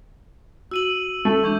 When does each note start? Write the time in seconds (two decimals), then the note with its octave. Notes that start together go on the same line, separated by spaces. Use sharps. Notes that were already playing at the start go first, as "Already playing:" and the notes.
0.71 F#4 E6 D#7 F#7
1.25 A3
1.44 E3 G#3 D4 C#6 G6